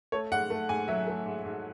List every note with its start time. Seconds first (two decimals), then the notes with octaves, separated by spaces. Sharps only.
0.12 A3 C#5
0.32 G#2 F#5
0.50 A3
0.69 G#2 G#5
0.88 F#3 E5
1.07 A3
1.26 G#2
1.45 G#2